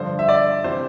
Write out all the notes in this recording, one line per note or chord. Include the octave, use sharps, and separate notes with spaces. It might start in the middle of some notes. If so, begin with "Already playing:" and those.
Already playing: G2 D3 F3 C5
E5
D5
C3 E3 C5